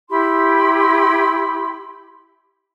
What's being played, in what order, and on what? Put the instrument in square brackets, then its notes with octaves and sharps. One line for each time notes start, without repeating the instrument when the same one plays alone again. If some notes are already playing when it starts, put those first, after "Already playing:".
[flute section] E4 G4 B5 C6